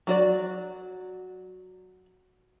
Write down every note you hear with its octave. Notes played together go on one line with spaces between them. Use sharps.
F#3 F#4 D5